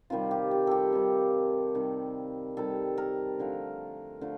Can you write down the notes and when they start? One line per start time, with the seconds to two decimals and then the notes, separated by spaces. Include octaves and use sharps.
0.10 C3 D#3 G3 F4
0.31 G4
0.51 G4
0.67 G4 A4
0.93 C3 D#3 G3
1.75 C3 D#3 G3
2.57 C3 D#3 G3 A4
2.98 A#4
3.39 D3 F3 A3
4.21 D3 F3 A3